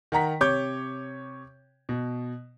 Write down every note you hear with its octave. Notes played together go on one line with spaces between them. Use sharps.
D#3 F#5 A#5 B6
C3 C#5 D6 G6
B2